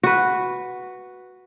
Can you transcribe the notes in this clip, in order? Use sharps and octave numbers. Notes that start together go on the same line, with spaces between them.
F#4 B4